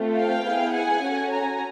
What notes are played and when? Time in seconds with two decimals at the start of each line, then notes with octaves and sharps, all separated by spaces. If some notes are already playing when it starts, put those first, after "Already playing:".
Already playing: A3 C4 F4
0.17 F5 G5
0.46 B3 E4 G#4
0.74 F#5 G#5
1.03 C#4 F#4 A4
1.31 G#5 A#5